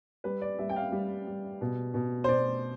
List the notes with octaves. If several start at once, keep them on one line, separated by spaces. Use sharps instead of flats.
G3 B4
D5
G3 E5
G5
F5
G3
G3
B2
B2
C5
B2 D5